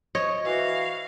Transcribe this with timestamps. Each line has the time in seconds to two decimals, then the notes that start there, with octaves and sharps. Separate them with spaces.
0.15 C#5 D#5
0.45 E3 F#4 F5